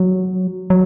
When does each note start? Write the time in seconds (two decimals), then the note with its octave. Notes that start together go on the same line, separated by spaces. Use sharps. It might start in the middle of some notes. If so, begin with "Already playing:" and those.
Already playing: F#3
0.70 F#3